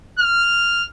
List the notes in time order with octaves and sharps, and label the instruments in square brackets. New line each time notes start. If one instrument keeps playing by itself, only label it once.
[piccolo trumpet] F6